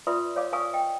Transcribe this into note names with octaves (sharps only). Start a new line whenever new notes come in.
F4 B4 D5 E5 C6 D#6
C#5 D5 F5 D6
A#4 B4 F5 G#5 C#6 D#6
D#5 G5